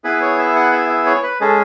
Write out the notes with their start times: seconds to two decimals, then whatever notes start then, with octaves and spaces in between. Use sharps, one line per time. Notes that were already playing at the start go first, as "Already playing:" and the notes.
0.04 B3 E4 G#4 B4
0.22 C#5
0.38 E5
0.56 F#5
0.72 E5
0.90 E5
1.06 C#5
1.23 B4
1.40 G#3 C#4 G#4 A4